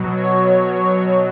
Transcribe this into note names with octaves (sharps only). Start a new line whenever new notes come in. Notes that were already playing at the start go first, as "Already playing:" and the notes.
Already playing: B2 F#3
C#5